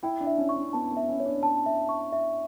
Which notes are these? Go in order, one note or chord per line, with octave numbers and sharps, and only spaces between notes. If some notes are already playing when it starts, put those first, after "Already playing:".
E4 G5
D4
E5
C#4
C#6
C#4
B3 A5
B3
E5
C#4
C#5
D4
A5
E5
C#6
E5